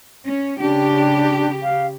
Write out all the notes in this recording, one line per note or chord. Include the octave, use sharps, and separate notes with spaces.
C#4
C#3 D4 G4
F5